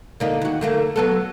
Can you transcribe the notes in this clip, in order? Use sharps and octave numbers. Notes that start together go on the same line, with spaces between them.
D3 A#3 D#4
D#2 F#4
D3 A3 A#3
F#3 B3 A4